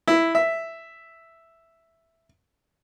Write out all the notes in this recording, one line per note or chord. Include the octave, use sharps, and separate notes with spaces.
E4
E5